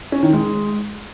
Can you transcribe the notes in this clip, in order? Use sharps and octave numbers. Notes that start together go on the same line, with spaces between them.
C#4
D#3
G#3